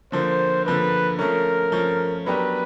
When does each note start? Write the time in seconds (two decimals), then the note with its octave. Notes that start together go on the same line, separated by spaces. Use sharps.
0.12 D3 F3 A#3 C5
0.66 D3 F3 A#3 B4
1.19 F3 A3 C#4 A#4
1.72 F3 A3 C#4
2.26 F#3 B3 D4 G4 A#4 B4